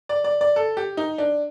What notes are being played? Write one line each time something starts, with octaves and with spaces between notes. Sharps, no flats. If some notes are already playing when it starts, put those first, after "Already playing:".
D5
D5
D5
A4
G4
D#4
D4